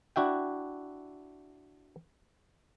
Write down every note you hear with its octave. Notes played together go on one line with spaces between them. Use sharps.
D4 E4 F#4 E5 G5